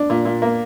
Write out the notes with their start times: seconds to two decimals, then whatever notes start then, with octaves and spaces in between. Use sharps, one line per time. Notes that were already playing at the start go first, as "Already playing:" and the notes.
Already playing: D4
0.10 A#2
0.25 A#2
0.42 A#3